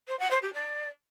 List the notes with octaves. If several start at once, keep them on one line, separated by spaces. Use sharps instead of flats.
C5
F#5
C5
G4
D5